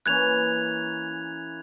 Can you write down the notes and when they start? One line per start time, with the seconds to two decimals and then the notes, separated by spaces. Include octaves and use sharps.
0.06 E3 A#3 C#4 F#6 G#6 F7